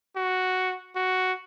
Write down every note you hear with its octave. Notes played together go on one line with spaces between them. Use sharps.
F#4
F#4